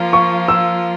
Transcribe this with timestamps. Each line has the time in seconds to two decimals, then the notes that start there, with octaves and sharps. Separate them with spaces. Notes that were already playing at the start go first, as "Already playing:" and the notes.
Already playing: F3 A#3 F4
0.13 C#6
0.48 E6